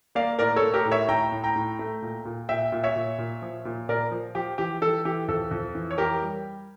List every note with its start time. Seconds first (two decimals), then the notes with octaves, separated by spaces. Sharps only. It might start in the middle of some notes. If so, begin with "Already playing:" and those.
0.15 A#3 D5 F5
0.39 A2 A#4 D5
0.56 A4 C#5
0.62 A3
0.74 G4 A#4
0.85 A2
0.91 C#5 E5
1.09 A2 G5 A#5
1.32 A2
1.44 G5 A#5
1.56 A2
1.79 A3
2.02 A#2
2.25 A#2
2.49 A#2 E5 G5
2.72 A#2
2.84 C#5 E5
2.96 A#2
3.18 A#2
3.42 F3
3.65 A#2
3.89 A#2 A#4 D5
4.11 F3
4.35 F3 G4
4.58 E3 G4
4.81 E3 A4
5.05 E3 G4
5.28 F2 A4
5.51 F2
5.75 E3
5.91 C#5
5.98 E3 G4 A#4
6.22 G3